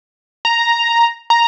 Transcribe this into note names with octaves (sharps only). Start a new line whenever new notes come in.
A#5
A#5